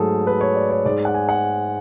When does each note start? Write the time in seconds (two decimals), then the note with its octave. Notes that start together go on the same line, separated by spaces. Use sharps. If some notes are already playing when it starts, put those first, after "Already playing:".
Already playing: G#2 F#3 A3 G#4 A4
0.27 B4
0.41 C#5
0.55 D5
0.70 C#5
0.85 G#2 D5
0.89 G#3
1.05 F#5
1.14 G#5
1.29 F#5